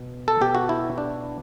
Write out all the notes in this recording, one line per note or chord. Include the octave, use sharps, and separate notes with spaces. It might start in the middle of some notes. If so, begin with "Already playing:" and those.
Already playing: B2
A4
B2 G4
F#4
E4
D4